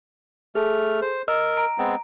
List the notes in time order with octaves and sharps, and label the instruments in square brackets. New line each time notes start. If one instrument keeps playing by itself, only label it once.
[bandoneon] A3 F6 [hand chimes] G#4 A4
[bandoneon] C5
[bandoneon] A#4 [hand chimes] D#5 E6 F6
[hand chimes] A#5 D7
[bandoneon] G#3 B3 C4